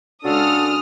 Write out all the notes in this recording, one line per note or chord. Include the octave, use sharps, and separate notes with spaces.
C#3 G#3 D4 F#4 A4 D#6 F6